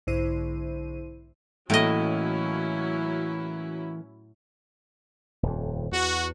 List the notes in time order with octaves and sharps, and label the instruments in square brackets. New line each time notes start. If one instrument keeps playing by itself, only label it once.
[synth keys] B1 G#2 D3 E4 C5 D#7
[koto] A2 D#5 [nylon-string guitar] E3 A3 A#3 [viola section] F#3 C#4 E4
[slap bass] D#1 F2
[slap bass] E2 [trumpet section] F#4